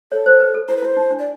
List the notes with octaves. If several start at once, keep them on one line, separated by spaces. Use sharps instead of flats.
A4 C#5
C5
B4
A4
E4 C5
B4
E4
C5
D#4
D4
D5